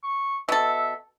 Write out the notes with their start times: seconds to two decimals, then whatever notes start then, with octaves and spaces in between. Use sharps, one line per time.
0.04 C#6
0.49 B2 A4 E5